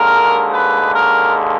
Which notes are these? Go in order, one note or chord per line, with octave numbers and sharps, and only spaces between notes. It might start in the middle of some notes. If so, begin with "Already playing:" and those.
Already playing: D#2 D3 G#3 A#4
B4
A#4